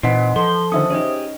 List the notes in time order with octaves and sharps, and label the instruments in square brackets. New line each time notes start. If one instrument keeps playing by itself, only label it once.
[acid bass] A#2 [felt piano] E3 B6 [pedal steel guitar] C4 [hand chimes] D#4 D#5 F#5
[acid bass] F3 [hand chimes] A4 [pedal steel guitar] C6
[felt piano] D3 D#3 A4 [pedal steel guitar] C#4 [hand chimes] C5 E5 D#6
[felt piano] C#4 D#4 [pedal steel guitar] G4 G#4